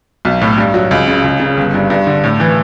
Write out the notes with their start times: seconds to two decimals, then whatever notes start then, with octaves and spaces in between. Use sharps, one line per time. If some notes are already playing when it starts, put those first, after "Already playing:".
0.25 B1
0.42 A2
0.57 G2
0.74 F#3
0.91 C#2
1.08 C#3
1.24 C#2
1.40 C#3
1.57 G1
1.74 G2
1.90 G2
2.07 D3
2.24 A2
2.40 E3